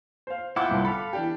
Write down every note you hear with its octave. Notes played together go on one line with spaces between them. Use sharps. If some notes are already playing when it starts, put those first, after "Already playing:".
C5 F5
E4 F4 F#5 G5 D6
G1 C2 G2
A4 F5 B5
E3 D4 G4